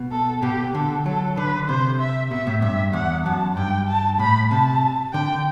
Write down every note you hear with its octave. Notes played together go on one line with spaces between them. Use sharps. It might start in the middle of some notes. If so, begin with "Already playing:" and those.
Already playing: B2
A4
B2 G4
D3 A4
F#3 A4
D3 B4
C3 C5
E5
B2 E5
A2
G2 E5
E2 F#5
F#2 A5
G2 G5
A5
A2 B5
C3 A5
D3 G5